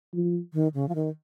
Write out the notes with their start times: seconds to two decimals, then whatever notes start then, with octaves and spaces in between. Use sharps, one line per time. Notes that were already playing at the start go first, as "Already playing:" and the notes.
0.14 F3
0.54 D#3
0.74 C#3
0.89 F3
0.95 D#3